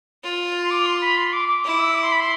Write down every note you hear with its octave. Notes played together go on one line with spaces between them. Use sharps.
F4
C6
D6
C6
B5
C6
D6
D6
E4 D6
E6
D6
C6
B5
C6